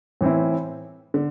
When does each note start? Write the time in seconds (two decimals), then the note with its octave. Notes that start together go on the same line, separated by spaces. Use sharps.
0.21 A2 E3 C4 E4
1.14 D3